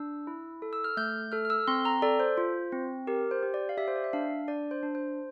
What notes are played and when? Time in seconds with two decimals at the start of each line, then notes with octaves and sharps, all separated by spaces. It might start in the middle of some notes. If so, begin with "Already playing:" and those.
Already playing: D4 E6
0.27 E4
0.62 A4
0.73 E6
0.84 F6
0.97 A3 G6
1.32 A4 F6
1.45 F6
1.50 E6
1.67 C4 C6
1.85 A#5
2.02 A4 D5
2.20 C5
2.38 F4
2.72 C4
3.07 G4 A#4
3.31 C5
3.43 G4
3.54 D5
3.69 F5
3.78 G4 E5
3.88 C5
3.96 D5
4.04 E5
4.13 D4 F5
4.48 D4 D5
4.71 C5
4.83 D4
4.95 C5